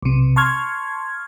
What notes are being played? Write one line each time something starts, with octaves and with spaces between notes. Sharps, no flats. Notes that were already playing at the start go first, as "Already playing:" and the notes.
B1 C3
A5 C6 C#6 F6 G#6